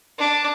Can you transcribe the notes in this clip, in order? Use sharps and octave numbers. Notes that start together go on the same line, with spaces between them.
D4